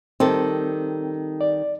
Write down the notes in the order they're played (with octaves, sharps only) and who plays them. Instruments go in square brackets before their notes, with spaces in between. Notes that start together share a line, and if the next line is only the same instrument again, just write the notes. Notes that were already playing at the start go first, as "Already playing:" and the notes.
[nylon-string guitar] D#3 G3 A4 [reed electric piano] C4
[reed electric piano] D5